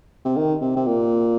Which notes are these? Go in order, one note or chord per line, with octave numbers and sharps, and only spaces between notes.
C3
D#3
C3
C3
A#2